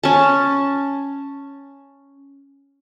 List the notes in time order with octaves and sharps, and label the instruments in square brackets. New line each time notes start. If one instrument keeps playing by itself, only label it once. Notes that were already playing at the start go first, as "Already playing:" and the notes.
[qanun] C#4 A5